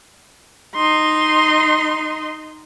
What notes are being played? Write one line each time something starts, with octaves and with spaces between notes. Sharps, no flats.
D#4 C6